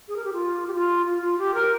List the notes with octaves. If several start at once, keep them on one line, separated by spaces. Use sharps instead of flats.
G#4
A#4
G4
F4
G4
F4
F4
F4
G4
A#4